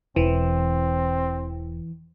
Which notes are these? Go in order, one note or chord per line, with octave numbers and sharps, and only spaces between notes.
E1 E3 C4